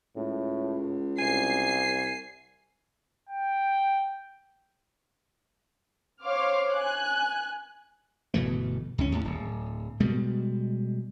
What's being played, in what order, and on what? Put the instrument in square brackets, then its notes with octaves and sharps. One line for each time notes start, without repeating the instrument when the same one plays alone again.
[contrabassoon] C#2 [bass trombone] A2
[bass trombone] C2 [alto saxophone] G#5 [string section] C7
[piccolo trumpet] G5
[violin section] C5 C#5 F5 C6 D6 F6
G#5 F#6
[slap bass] G1 B2 E3 A3
C#2 C#4
D#2 A2
D1
B2 G3 G#3